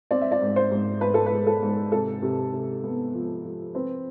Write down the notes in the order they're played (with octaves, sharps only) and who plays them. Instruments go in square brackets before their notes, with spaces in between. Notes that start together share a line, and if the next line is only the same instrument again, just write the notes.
[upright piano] C4 D5
E5
D5
G#2
C5
G#2
G#2 B4
A4
B4
G#3
A4
G#2
C3 A4
C3
C3
B3
F3
F3
C4 B4